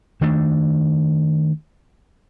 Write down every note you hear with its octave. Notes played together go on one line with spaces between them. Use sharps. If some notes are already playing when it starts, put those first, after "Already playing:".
D#3 A3 D4